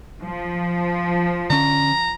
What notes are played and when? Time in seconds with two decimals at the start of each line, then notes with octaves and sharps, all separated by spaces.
0.21 F3
1.50 D3 C#4 A#5